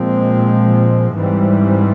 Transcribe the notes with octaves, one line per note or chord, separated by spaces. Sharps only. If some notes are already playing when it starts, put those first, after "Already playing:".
Already playing: A#2 F3 G#3 C4
G#2 E3 G3 C4